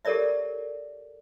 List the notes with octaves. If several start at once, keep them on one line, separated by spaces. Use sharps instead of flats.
G4 A4 A#4 C#5 D5 E5